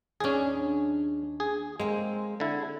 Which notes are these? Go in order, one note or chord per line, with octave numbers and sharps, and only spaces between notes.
D#2 C#4 D4 G#4
G#4
G#3 A#3 C4
D3 E4